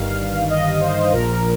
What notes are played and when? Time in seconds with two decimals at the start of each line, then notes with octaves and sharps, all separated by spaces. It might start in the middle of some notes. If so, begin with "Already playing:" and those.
Already playing: G1 G2 D#3 F5
0.21 F5
0.50 D#5
0.81 C5
1.12 A#1 A#2 F3 A#4